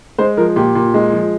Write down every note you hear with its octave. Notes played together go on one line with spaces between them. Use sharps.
G#3 C5
F3 A#4
A#2 G4
A#2
G#3
F3